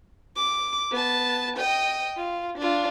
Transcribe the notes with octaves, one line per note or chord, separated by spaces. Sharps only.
D6
B3 A5
D#5 G5
F4
D4 F4